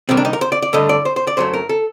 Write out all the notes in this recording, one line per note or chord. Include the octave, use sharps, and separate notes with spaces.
C3 D#3 G3 A#3 C4
D4
D#4
A#4
C5
D5
D5
G2 D3 A3 D#5
D5
C5
C5
D5
F#2 F#3 A3 C5
A#4
A4